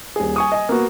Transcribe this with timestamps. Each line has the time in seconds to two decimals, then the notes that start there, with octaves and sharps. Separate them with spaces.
0.16 D#1 G#4
0.36 G#5 C#6 D#6
0.52 D#5 G#5
0.69 A#3 B3 F#4